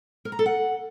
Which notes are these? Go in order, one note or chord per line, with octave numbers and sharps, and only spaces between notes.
A#4
A#5
A4
F#5